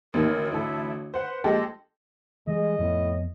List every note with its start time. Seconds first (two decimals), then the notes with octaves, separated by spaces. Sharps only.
0.14 A1 D#2 A#4
0.36 D2
0.52 A1 E4 A4
1.14 B4 C5 F#5
1.44 A#1 G#3 G4 A4 D#5
2.47 E3 G3 G#3 D#5
2.79 F2 A2 F3 B3